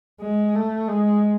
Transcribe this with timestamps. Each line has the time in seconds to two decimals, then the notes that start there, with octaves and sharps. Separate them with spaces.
0.21 G#3
0.55 A3
0.88 G#3